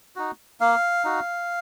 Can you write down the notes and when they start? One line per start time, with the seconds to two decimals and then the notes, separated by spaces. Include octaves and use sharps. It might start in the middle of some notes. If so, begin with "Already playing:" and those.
0.16 D#4 F#4
0.60 A#3 F5
1.04 D#4 F#4